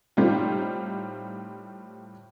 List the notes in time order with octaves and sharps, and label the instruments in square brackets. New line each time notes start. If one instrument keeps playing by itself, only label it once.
[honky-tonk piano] A2 G3 C4 D#4 F4